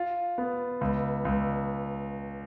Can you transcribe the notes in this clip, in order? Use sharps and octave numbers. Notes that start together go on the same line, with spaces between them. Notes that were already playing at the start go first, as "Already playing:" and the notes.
Already playing: F4
B3
C#2
C#2